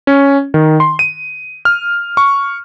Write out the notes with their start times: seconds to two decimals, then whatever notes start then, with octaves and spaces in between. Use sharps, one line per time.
0.07 C#4
0.54 D#3
0.80 C6
0.99 D#7
1.65 F6
2.17 C#6